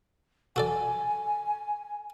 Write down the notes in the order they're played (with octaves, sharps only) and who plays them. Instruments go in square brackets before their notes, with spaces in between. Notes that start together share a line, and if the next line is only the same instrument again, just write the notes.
[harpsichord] F#4 A4 D5 [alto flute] G#5